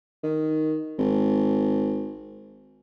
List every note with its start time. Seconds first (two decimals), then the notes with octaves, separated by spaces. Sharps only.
0.23 D#3
0.98 G#1